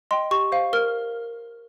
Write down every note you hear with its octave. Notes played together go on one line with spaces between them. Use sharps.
D#5 G5 C6
G4 C#6
C5 F5
A#4 F6